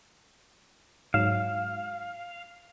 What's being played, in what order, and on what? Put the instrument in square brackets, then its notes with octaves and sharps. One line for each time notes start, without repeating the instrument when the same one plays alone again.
[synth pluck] G#2 F#3 E7 [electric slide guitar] F5